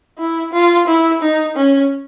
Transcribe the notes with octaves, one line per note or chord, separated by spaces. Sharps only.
E4
F4
E4
D#4
C#4